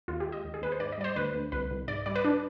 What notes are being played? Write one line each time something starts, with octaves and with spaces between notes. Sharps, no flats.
D#2 F4
G4
G#3
D#5
D#2
G#4
D#2 B4
C5
G#2 D5
D#5
G3 D5
C5
D2 B4
D2
C2 B4
C2
G#2 D5
G3 D5
B4
D4